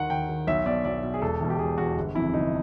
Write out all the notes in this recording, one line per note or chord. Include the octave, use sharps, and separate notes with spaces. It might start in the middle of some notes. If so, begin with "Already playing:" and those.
Already playing: D#2 D#3 F#5
D#2 G5
D#3
B1 E5
B2 D5
B1 D5
B2
G#4
E1 A4
E2 B2
G4
E1 G#4
E2 B2 F#4
G1
F2 C3 E3 E4
G1 D#4